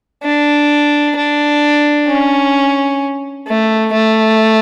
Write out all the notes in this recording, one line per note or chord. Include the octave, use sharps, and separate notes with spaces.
D4
D4
C#4
A3
A3